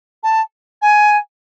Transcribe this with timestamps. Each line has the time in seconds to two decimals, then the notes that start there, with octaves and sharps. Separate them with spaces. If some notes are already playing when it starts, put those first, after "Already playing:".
0.23 A5
0.82 G#5